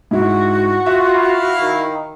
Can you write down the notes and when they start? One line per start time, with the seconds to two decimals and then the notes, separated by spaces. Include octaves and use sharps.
0.11 G#2 E4 F#4
0.86 F4 E5
1.15 E4 F5
1.61 D#3